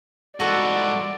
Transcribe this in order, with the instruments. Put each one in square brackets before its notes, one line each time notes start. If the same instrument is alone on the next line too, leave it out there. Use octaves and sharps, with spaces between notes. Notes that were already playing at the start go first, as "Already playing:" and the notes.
[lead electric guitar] G#2 E3 [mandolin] F#4 A4 A5 [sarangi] D5 [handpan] F#5